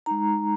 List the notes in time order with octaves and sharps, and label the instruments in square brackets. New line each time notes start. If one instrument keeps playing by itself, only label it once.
[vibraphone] G#3 D#4 A#5